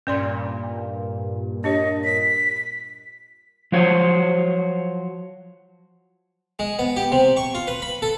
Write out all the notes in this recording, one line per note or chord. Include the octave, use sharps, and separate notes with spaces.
G2 A#2 C#4 D5 C6
D4 G4 C#5 D#5
B6
F3 F#3 F#4 C5 C#5
G#3
B3
G4
C3
C#6
F4
B4
B5
A4